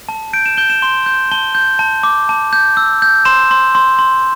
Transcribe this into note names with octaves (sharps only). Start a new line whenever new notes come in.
A5
G6 D7
E7
G6 G7
E7
C6 G7
G6
A5 G7
G6
A5
D6
A5
G6
E6
G6
C6 E7
C6
C6
C6